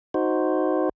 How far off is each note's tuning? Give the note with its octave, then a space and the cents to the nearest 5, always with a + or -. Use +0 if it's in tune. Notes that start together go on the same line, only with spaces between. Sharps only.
D#4 +0 F#4 +0 C5 +0